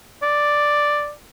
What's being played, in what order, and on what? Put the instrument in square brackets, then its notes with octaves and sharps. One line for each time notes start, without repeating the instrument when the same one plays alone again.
[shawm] D5